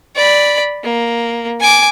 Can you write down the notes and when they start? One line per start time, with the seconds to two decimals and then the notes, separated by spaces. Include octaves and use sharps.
0.16 D5 B5
0.84 A#3
1.60 G#5 D6